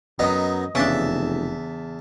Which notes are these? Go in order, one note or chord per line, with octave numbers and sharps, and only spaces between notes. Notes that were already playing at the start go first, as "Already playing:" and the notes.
F#2 F#3 B3 D#4 D#5 D#6
F1 E2 C#3 D4 E5 A5